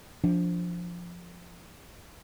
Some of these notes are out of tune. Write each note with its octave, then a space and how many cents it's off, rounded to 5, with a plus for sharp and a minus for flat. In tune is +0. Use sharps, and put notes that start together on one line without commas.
F3 +0 D4 -15